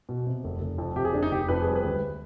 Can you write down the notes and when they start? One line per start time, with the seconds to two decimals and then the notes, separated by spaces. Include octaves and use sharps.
0.09 B2
0.27 C3
0.44 F1
0.61 F1
0.78 F2
0.96 C3 G4
1.05 G#4
1.14 F1 D4
1.23 D#4
1.31 F1 G4
1.48 F2 B4
1.62 G#4
1.67 G3
1.75 B4
1.84 D2